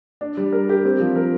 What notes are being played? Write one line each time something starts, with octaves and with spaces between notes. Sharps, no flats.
D4
G3
A#4
G4
C4
F3
A#4